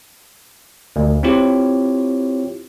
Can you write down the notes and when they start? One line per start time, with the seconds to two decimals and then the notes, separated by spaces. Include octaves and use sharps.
0.96 D2
1.23 C4 E4 F4 G4 C#5